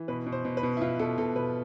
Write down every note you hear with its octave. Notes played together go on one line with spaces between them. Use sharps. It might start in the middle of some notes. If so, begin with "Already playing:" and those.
Already playing: E3
B2 B4
B2
C5
B2
B4
B2
E4
B2 F4
B2 A4
B2 A4
B2 B4